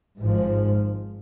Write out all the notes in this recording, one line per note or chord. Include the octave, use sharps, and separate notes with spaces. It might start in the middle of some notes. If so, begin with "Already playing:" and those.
G#1 G#2 F3